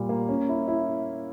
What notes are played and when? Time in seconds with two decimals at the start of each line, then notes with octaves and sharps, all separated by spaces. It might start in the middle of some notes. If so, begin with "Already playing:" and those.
Already playing: A#2 G3
0.09 A#3
0.29 C#4
0.49 E4
0.68 E4